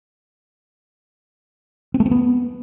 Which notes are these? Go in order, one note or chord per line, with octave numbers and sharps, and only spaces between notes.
C4
A3
C4
B3